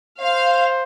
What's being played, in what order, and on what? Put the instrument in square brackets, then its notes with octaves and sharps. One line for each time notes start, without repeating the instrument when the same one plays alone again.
[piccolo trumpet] C5 [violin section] F5